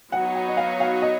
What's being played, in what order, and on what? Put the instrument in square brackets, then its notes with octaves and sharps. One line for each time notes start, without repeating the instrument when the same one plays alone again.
[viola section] F#3 B3 D#4 F#4 C#5 [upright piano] F#5
[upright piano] F#5
D#5
F5
F5
D#5